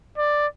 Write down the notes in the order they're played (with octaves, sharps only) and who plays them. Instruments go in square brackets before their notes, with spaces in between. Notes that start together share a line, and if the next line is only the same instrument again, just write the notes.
[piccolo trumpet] D5